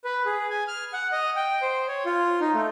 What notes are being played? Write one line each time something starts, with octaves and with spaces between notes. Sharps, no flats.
B4
G#4
G#5
F6
F#5
D#5
G5
C5
C#5
F4
D#4
A3